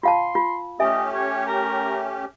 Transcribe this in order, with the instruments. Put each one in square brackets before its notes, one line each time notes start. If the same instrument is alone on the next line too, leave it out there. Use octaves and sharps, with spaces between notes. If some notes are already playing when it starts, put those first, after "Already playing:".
[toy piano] F4 F5 A5 [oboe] C6
[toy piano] F4
[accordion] A3 C#4 G4 [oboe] D#5 [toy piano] E5 G#5
[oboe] C#5
A#4